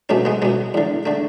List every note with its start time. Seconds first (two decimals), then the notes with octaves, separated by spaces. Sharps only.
0.09 C#2 B2 A3 C#4
0.25 G#3 B3
0.42 C#2 B2 G#3
0.74 E2 D3
1.06 D3 A3